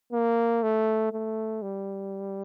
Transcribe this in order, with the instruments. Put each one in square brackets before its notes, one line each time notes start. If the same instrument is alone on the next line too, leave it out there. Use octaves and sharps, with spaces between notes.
[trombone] A#3
A3
A3
G3